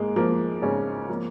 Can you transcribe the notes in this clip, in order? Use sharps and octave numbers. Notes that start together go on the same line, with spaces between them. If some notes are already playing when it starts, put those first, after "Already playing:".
Already playing: G#2 G#3 A#3
F3 A#3
G#2 C#3 C#4
F3 A#3